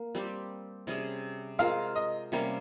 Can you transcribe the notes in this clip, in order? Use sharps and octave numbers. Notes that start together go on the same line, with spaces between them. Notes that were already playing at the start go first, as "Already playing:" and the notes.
Already playing: A#3
G3 C4 G4
C3 G3 C#4 G#4
G#3 C4 F4 A#4 F5
D#5
C3 G3 A#3 C#4